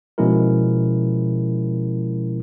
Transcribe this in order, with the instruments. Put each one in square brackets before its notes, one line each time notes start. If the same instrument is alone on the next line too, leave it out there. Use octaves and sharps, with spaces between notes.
[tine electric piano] B2 F3 G#3 C#4 E4 A#4